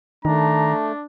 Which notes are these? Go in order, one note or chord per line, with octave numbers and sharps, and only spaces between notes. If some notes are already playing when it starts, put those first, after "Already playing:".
D#3 A3 D4 A#5